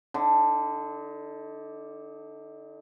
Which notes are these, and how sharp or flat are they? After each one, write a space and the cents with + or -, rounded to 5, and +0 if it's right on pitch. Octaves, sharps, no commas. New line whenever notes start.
D3 +0 D#4 +35